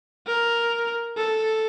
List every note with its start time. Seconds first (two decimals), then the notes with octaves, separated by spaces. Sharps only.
0.27 A#4
1.17 A4